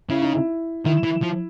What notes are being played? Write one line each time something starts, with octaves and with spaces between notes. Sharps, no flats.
C#3 E4
D#4
E4
D#3 E4
E3
F3